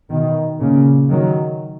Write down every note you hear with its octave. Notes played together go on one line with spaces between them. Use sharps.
B2 D#3
A#2 C#3
D#3 F#3